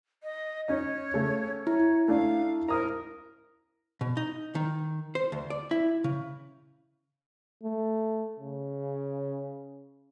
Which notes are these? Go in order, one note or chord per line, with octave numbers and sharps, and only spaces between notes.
D#5
C#4 D#4 C#5
C#3 A3
E4 C#5
A3 D4 F5
A#4 A#5 D#6 F6
B2
D#4
D#3
C5
D2
D5
E4
C#3
A3
C#3